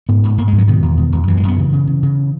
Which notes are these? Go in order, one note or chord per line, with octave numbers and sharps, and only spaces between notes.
G#2 B3
G#2
G#2 A#3
G#3
G#2
F#3
B2 D#3
E2
B2
E2
F#2 E3
G#3
F#2 B3
C#3 E3
C#3
C#3
C#3